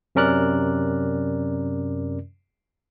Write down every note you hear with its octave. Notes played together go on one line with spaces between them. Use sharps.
F#2 C3 C#4 A#4 D5 F#6